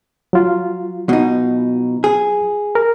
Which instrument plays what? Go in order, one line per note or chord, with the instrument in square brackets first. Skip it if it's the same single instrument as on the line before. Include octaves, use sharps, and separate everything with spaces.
[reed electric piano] F#3 F4
[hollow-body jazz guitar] B2 D#4
G#4
[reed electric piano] A#4